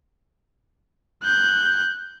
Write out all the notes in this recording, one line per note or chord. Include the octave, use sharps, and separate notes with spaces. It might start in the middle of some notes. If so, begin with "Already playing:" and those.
F#6 G6